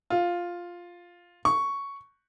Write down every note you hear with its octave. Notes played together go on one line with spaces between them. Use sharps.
F4
C#6